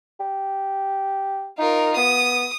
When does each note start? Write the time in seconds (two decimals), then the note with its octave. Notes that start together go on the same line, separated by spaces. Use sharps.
0.20 G4
1.58 D#4 F4 A#4
1.97 B3 D#6